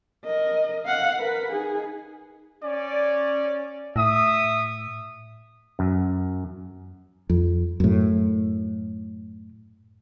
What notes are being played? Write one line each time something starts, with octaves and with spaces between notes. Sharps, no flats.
A#4 D#5
F5 F#5
A#4 B4
D#4 G#4
C#4 D5
A2 E5 D#6
F#2
F2
F#2 A2